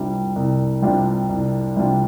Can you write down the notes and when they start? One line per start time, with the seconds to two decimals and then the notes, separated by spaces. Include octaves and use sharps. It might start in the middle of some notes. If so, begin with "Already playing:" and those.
Already playing: C2 C3 G3 D4 F4
0.36 C2
0.82 C3 G3 D4 F4
1.29 C2
1.76 C3 G3 D4 F4